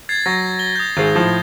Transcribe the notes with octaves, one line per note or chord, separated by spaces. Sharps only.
G#6 A6 C7
F#3 A#6
G7
D#6 G6
G#1 G#4
A2 F3